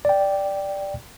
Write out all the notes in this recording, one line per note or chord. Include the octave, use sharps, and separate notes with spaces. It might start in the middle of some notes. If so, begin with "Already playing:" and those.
D5 G5